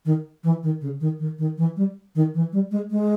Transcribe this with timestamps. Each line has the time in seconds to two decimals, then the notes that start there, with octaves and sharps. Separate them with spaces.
0.05 D#3
0.44 E3
0.63 D#3
0.81 C#3
1.00 D#3
1.19 D#3
1.38 D#3
1.57 E3
1.77 G3
2.15 D#3
2.34 E3
2.52 G3
2.71 G#3
2.91 G#3